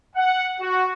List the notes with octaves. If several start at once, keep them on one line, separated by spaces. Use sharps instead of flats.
F#5
F#4